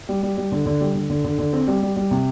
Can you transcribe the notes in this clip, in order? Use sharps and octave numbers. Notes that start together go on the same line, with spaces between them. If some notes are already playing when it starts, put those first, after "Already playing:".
G3
G3
G3
D3
D3
G3
D3
D3
D3
D3
C4
G3
G3
G3
C3